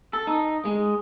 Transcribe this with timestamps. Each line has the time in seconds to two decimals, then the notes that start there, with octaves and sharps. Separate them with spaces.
0.13 A4
0.27 D#4
0.65 G#3